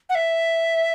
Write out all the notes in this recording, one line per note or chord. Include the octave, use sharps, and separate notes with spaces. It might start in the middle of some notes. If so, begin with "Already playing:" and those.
F#5
E5